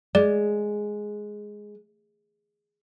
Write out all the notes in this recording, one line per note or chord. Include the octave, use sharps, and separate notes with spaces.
G#3 D5